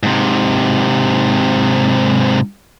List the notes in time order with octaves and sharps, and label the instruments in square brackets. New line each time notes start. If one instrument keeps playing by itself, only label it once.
[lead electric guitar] G#2 C3